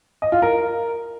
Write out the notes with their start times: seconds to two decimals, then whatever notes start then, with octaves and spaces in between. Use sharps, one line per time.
0.22 D#5
0.32 F4
0.42 A#4